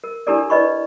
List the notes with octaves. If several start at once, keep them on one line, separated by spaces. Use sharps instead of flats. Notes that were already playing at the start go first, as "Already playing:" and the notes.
A#4
D4 E4 G4 A4 A#4 D5
E4 B4 D5 D#5 B5 C#6